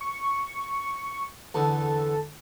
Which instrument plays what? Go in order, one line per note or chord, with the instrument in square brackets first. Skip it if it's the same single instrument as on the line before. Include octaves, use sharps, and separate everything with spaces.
[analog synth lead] C#6
[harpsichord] E2 D3 [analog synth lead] A4